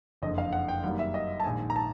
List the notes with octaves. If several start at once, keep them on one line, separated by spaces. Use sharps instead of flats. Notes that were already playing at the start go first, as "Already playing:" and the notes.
F#1 F2 D3 D#5
F5
F#5
G5
F#2 D#3 G3 A#3 F#5
E5
D#5
A5
A#1 G#2 D#3 G#5
A#5
A5